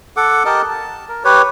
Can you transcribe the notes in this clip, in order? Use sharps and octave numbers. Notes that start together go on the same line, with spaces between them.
A4 F#5 D6
G4 A#4 D#5 A5
A5
A#4
G4 B4 C#5